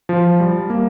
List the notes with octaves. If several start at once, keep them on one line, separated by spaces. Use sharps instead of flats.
F3
G3
A#3